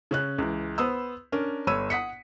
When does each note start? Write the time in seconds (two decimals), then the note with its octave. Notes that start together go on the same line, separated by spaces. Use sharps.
0.11 C#3 C#4 F#6
0.38 C#2 E3
0.78 B3 C5 B5 D#6 E6
1.32 C#4 D4 A#4
1.67 G1 C#5 B5 E6 D#7
1.90 F#5 D#6 B6 C#7